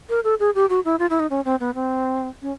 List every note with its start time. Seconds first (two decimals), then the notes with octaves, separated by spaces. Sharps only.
0.09 A#4
0.24 A4
0.40 G#4
0.55 G4
0.69 F#4
0.85 E4
0.99 F4
1.10 E4
1.20 D#4
1.30 C#4
1.45 C4
1.60 B3
1.75 C4
2.42 C#4